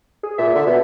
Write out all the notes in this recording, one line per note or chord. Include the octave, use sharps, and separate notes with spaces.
G#4
A#2 E5
D3
B2